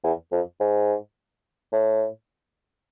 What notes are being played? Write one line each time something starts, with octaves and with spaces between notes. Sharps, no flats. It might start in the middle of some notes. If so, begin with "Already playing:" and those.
E2
F2
G#2
A2